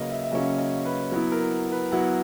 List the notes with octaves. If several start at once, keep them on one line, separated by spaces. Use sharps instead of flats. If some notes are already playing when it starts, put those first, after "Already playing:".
Already playing: C#3 F#3 A#3 C#4 A#4 B4 C#5 D#5
E5
E5
C#3 F#3 A#3 C#4 D#5
D#5
B4
F#3 B3 E4
A#4
B4
F#3 B3 E4 F#5